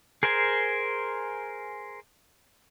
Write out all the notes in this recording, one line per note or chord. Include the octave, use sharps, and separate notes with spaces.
G#4 A#4 C5 G#5